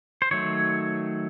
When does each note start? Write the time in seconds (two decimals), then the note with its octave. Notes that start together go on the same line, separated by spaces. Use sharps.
0.22 C5
0.31 D#3 F#3 A3 C#5